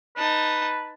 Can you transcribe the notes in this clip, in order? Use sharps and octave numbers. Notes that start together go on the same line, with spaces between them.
D#4 B4 A5